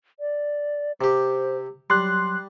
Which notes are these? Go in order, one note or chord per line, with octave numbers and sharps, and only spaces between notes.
D5
C3 G4 C5
F#3 G3 C6 F#6